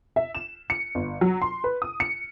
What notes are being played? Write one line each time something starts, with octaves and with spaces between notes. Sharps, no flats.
E5
E7
C#7
G1
F#3
C6
B4
D#6
C#7